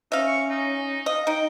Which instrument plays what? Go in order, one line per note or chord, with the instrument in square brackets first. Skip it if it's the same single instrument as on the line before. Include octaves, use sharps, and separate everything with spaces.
[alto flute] C#4 [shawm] D#4 [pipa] E5 F5
[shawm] C#6
D#4
[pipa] D#5 [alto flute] F5
[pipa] D#4 [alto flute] D#5 [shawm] G5